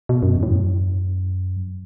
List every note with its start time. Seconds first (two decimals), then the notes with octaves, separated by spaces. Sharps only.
0.09 B2
0.23 F#2
0.36 E2
0.43 A2
0.49 F#2